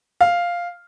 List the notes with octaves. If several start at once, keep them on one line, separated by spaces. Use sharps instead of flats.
F5